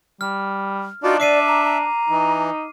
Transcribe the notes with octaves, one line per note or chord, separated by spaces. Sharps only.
G3 F6
D4 D#4 F4 F#4 D5
D5 E5 D6 C7 D#7
A#5
A#5
E3 D#4